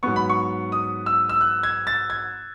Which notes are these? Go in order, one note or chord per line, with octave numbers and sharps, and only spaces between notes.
G#2 F#3 B3 C#6
B5
C#6
D#6
E6
E6
F#6
G#6
A6
G#6